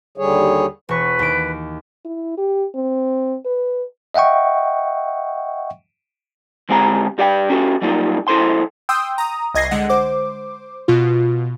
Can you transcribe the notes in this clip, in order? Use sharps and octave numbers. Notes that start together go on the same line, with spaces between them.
D#2 D3 G3 G#4 C#5
E1 B4 C#6
D#2 D7
E4
G4
C4
B4
D#5 E5 F#5 G5 C#6
D3 G#3 C4 G4 F#5 A#5
G2 G4 D5 F5 G5
C#4 F#4 G4 A4
F#3 G3 A#3 C4 D#4 F4
B1 E4 A4 C5 C6
G5 C6 D#6 E6 G6
A#5 D#6
C2 D#5 G#6 A#6 C7
D3 G#3 F#5
C5 D6
B2 F4